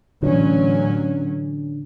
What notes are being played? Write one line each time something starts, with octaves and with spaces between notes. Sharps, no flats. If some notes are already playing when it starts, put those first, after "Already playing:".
A1 D3 F#3 C#4